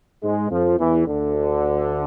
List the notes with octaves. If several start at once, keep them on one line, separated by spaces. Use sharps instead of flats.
G#2 G#3
F2 F3
E2 E3
D2 D3